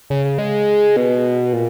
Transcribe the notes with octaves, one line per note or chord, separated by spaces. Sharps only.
C#3
C#3
G#3
B2
A#2